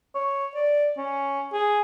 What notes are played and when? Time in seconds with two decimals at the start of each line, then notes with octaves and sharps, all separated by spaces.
0.15 C#5
0.55 D5
0.98 C#4
1.53 G#4